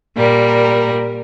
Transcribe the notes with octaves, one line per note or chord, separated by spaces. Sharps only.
A#2 G3 A#4